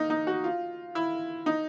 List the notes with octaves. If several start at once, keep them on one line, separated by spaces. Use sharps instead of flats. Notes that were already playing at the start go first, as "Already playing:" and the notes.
Already playing: A#3 D#4
D#4
F#4
F4
E4
D#4